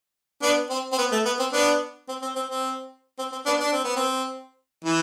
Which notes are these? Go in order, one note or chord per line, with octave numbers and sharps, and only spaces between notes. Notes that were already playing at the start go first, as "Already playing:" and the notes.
B3 D4
C4
C4
B3
A3
B3
C4
B3 D4
C4
C4
C4
C4
C4
C4
B3 D4
D4
C4
B3
C4
E3